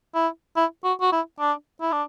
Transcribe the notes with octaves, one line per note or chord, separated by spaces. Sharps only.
E4
E4
F#4
F#4
E4
D4
E4
D4